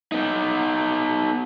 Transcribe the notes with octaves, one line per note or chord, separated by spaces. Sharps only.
B3 D#4